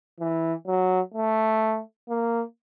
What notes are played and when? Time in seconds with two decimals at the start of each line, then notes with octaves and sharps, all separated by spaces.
0.20 E3
0.67 F#3
1.14 A3
2.09 A#3